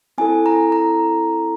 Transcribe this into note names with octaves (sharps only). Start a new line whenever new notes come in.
C4 E4 A4 G#5
A#5
A#5